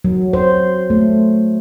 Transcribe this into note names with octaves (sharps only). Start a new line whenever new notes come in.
F#3
C5
A3